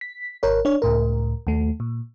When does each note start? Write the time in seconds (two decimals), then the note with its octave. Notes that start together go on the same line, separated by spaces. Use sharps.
0.01 B6
0.43 G#1 A#4 C#5
0.65 D4 C#5
0.82 C#2 A2 A#4
1.47 D#2 A3
1.80 A#2